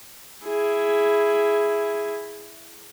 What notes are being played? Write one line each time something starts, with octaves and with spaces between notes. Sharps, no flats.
E4 G#4